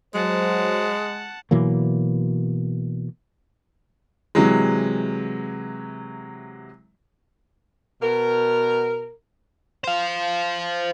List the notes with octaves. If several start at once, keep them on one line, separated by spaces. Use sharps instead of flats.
F#3 G#3 C5 F#5 A5
B2 E3 F#3 A#3
C3 E3 F#3 G#3
B2 A#4
C5 F5